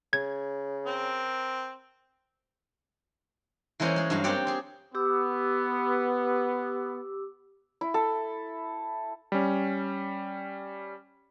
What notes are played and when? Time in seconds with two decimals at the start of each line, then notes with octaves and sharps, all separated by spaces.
0.13 C#3 G#6
0.86 C4 A#4
3.80 E3 G#3 A#3 C#4 C5
3.96 G#3 G#4
4.10 G2 F#3 G#3 F5
4.24 A#3 C4 G4 D5 F#5 G5
4.47 C4 G#4
4.95 B3 G4 D6 E6
7.81 E4
7.94 A4
9.32 G3 C#4